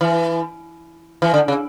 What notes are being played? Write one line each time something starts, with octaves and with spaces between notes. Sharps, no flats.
E3
E3
D3
C#3